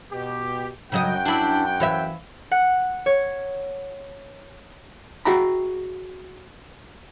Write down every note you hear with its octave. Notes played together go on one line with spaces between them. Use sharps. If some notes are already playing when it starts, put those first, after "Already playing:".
B2 G4
F#2 C#3 F#3 D#5 F#5 G5
D4 E4
E3 C#5 E5
F#5
C#5
F#4 G#4 E5 G5 A#5 B5